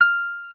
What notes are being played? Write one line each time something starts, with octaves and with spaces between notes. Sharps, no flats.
F6